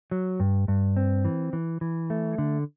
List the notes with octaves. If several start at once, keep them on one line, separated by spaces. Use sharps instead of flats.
F#3
G2
G2
C4
E3
E3
E3
A3
D3